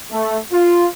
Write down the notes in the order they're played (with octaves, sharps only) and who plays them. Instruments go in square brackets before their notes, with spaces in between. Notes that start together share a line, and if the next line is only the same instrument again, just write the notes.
[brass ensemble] A3
F4